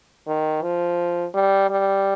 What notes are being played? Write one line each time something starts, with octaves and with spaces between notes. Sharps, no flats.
D#3
F3
G3
G3